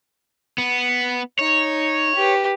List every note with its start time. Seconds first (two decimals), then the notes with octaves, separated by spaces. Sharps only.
0.58 B3
1.39 D#4 C#5
2.15 G4 B4